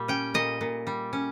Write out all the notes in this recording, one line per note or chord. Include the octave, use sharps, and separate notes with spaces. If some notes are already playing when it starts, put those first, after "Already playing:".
Already playing: A#2 G3
C#4 G5
A#2 D#5
A#2
G3
C#4